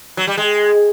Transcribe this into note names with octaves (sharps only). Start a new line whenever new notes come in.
F#3
G3
G#3